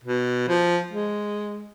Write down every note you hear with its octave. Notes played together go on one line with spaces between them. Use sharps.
B2
F3
G#3